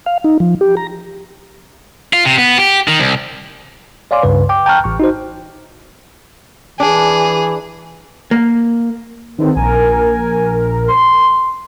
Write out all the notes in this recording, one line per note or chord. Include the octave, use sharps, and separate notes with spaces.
F5
D#4
F3
G4
A#5
F4
C3
B3
G4
D#3
C2
C#5 D5 F5 G#5 C6 D6
C#2 G2 C#3 B4
G5 D6
G5 A5 A#5 C#6 F6 F#6
A1 C#6
D#4 F#4 C5
E3 D4 G#4
A#3
E2 D3 D#3 C4
A#1 A#4 G#5
C6